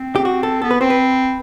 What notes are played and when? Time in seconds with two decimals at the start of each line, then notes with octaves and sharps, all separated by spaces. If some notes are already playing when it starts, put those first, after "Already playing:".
Already playing: C4
0.16 G4
0.25 F#4
0.43 A4
0.62 B3 A4
0.71 B4
0.81 C4 C5
0.90 B4